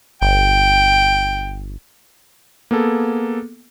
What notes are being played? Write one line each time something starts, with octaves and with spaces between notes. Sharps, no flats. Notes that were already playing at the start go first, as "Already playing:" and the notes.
G1 G5
A#3 B3 G#4 A4